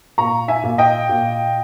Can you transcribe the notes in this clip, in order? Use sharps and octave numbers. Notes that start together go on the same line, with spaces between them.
A#2 A#5 C#6
E5 G#5
A#2
D#5 G5
A#2